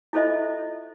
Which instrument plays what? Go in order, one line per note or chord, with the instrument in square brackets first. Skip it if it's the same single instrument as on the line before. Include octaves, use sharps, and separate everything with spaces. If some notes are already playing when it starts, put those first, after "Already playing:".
[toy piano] E4 F4 A4 C5 D#5 E5